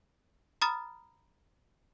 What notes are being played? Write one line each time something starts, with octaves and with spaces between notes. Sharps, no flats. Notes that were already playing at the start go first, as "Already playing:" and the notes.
A#5 B5 D#6 F6 A6